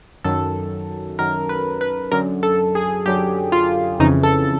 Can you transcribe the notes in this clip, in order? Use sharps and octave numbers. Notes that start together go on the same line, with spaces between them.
F#2 D#3 F#3 A4
F#2 D#3 F#3 A#4
B4
B4
F#2 D3 F#3 A#4
A4
G#4
F#2 D3 F#3 G4
F4
F2 C#3 E3 D#4
A4